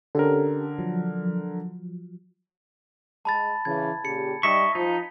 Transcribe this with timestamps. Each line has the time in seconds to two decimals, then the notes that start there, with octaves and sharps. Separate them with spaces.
0.15 D3 C#4 G4 A4 A#4
0.79 F3 F#3
3.25 G#3 A5 B5 A6
3.65 C#3 E3 G#6
4.05 A#2 C#3 G4 C#7
4.43 G3 D#4 D#5 E5 C#6 B6
4.75 F3 D#4